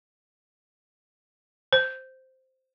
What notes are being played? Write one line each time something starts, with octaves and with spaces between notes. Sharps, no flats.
C5